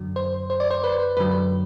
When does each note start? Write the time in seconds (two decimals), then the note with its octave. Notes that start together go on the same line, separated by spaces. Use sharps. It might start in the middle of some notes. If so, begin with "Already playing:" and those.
Already playing: F#2 D3 F#3
0.16 C5
0.50 C5
0.60 D5
0.71 C5
0.84 B4
1.17 F#2 D3 F#3 B4